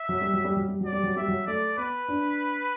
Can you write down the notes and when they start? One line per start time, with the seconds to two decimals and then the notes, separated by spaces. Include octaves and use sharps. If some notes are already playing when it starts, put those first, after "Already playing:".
Already playing: E5
0.09 F#3
0.21 G3
0.33 F#3
0.44 G3
0.56 F#3
0.68 G3
0.80 F#3
0.86 D5
0.92 G3
1.03 F#3
1.16 G3 E5
1.28 F#3
1.47 A3 D5
1.77 B3 B4
2.09 D4